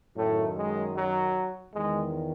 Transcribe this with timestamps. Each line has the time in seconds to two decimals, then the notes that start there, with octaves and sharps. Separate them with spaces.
0.17 F#2 A2 D#3 A3
0.56 G#3
0.95 F#3
1.73 E2 D#3 G#3